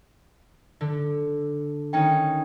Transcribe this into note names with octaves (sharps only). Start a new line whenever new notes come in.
D3
D#3 C#4 D#4 G5